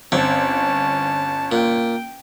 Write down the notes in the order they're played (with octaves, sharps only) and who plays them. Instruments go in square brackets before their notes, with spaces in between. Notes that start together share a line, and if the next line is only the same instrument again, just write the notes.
[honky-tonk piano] G1 [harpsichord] C4 [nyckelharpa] C#4 A5
[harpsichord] A#2 [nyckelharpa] G5